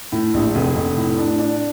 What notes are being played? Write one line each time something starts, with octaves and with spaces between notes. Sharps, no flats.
A2
A#1
F1
F1
A2
D4
D4